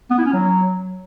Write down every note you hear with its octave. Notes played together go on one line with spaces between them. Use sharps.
B3
E4
C#4
F#3